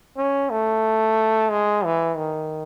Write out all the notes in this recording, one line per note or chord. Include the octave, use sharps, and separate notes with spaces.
C#4
A3
G#3
E3
D#3